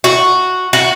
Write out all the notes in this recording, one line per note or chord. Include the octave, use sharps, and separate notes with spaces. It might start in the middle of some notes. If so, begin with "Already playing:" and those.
F#4
F#4